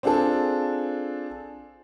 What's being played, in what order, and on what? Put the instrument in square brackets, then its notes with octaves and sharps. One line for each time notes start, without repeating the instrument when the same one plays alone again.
[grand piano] C4 D4 F4 G#4 A4